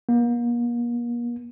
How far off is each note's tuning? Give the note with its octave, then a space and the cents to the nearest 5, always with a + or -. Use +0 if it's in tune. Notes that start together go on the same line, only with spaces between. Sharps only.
A#3 +40